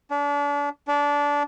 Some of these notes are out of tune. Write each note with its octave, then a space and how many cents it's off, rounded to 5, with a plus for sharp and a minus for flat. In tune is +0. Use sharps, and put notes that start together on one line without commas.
D4 -35
D4 -20